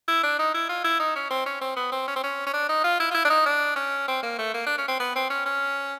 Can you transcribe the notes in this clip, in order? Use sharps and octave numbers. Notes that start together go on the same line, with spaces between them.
E4
D4
D#4
E4
F4
E4
D#4
C#4
C4
C#4
C4
B3
C4
C#4
C4
C#4
C#4
D4
D#4
F4
E4
F4
E4
D4
D#4
D4
C#4
C4
A#3
A3
A#3
D4
C#4
C4
B3
C4
C#4
C#4